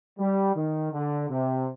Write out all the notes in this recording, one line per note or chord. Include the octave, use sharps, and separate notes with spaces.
G3
D#3
D3
C3